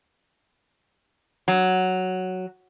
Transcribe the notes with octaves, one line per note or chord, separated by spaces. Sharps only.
F#3